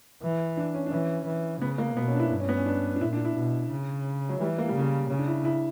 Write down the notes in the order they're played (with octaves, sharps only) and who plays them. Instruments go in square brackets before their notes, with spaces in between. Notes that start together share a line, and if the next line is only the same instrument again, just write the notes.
[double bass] E3
[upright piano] D4
C#4
D4
[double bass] E3 [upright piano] C#4
[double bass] E3
[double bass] C#3 [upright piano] B3
[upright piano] A#3
[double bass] B2 [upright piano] B3
[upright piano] C#4
D4
E4
[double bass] G2
[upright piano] C#4
B3
C#4
D4
D4
[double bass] A#2 [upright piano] E4
[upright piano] D4
E4
[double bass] B2
C#3
[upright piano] F#3
[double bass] E3 [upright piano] G3
[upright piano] A#3
G3
[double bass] C#3 [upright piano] A#3
[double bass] C#3 [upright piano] C#4
[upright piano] D4
E4
E4